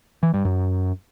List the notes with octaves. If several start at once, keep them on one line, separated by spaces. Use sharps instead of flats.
E3
G2
F#2